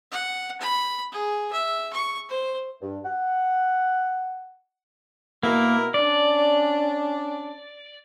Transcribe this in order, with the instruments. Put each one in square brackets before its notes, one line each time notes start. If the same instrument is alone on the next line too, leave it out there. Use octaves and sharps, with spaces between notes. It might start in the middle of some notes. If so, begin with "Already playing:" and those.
[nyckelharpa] F#5
B5
G#4
E5
C#6
C5
[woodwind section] G2
F#5
[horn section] B2 E4 A#4 [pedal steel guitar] A#3
[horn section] C#4 D4 [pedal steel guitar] D5